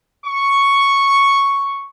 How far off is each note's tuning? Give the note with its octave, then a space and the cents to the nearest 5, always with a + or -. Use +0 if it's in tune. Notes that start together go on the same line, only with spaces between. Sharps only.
C#6 +0